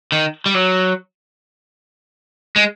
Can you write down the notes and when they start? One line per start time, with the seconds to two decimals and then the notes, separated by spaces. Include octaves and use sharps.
0.12 D#3
0.46 G3
0.54 F#3
2.56 G#3